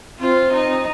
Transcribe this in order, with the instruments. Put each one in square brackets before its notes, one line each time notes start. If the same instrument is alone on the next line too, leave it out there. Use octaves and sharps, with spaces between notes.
[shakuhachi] C4 [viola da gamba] F4
[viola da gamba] D#4